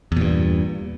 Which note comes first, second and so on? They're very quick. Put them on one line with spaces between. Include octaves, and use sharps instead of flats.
E2 A#2 G2